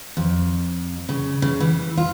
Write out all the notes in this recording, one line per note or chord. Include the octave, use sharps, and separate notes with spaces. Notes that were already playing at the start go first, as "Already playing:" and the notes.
F2
C#3
C#3
E3
F4